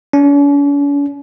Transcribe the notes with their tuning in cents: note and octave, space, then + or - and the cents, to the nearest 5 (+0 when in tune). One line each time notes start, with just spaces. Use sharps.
C#4 +45